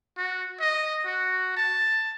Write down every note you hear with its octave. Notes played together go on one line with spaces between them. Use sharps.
F#4
D#5
F#4
A5